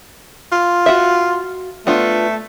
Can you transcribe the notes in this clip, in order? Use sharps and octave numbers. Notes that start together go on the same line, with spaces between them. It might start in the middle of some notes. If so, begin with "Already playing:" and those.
F4
F#4 E5
A3 B3 D4 F4